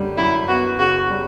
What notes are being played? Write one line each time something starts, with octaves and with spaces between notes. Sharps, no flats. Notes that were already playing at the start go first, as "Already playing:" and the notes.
Already playing: F#2 D3 G3
F#2 E4
B3 F#4
C#3 F#4
G3